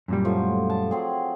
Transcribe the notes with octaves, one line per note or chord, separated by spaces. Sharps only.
F#2 A#2 G3
A2 F3 F#3
A5
F#3 C4 G#4